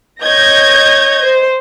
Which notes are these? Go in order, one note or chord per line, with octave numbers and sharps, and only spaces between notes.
C#5 D#5 G6 G#6 A#6
C5